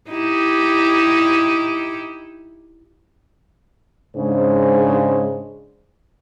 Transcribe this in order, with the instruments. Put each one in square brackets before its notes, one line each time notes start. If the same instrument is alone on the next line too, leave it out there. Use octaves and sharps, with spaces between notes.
[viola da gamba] D#4 E4 G4
[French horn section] G#2 C#3 G#3 D4 C5